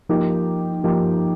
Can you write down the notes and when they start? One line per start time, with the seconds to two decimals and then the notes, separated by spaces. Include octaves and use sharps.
0.09 F3 A#3 D#4 G4
0.84 F3 A#3 D#4 G4